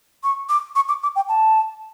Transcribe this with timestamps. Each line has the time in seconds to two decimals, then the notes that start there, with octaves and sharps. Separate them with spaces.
0.23 C#6
0.49 D6
0.76 C#6
0.89 D6
1.03 D6
1.16 G5
1.29 A5